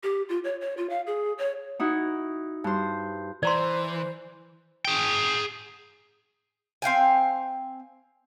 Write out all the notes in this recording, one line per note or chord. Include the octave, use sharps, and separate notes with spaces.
G4
F4
C#5
C#5
F4
F5
G#4
C#5
D#4 E4 F#4
G2 C5
E3 C5 D5 A#5 C6
G#4 G5
C4 F5 G5 G#5